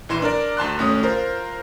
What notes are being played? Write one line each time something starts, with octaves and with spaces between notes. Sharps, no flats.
A#1 E3 C6 E7
D4 A#4 D5
D2 A5 C6 F#6
G#1 A3 C#4 D#6
F4 A#4 C5